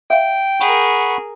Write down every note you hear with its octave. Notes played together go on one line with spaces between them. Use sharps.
E5 F5 G5
G#4 A#4 F#5 B5 C#6